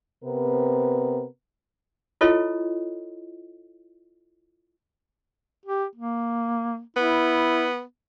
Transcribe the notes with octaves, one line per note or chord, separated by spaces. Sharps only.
C3 B3 C4 A#4 B4
E4 F4 A4 C#5 D#5
G4
A#3
B3 E4